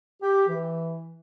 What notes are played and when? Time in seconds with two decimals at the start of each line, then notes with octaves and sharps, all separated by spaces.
0.22 G4
0.48 E3